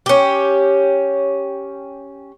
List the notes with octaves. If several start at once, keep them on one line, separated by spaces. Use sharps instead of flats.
C#4 G4